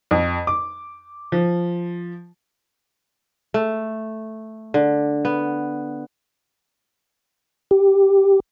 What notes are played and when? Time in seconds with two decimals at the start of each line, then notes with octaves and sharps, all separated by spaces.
0.11 F2
0.47 D6
1.32 F3
3.54 A3
4.74 D3
5.25 B3
7.71 G4